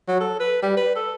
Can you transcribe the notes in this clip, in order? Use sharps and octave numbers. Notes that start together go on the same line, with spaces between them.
F#3
A4
B4
G3
B4
A4